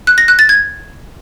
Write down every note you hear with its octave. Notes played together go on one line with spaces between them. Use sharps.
F#6
A#6
F#6
A6
G#6